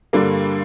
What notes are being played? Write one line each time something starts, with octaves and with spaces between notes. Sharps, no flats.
G2 D3 G3 A#3